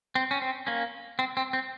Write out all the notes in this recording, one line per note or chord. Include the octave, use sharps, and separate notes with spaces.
C4
C#4
C4
A#3 C#4
C4
C4
C4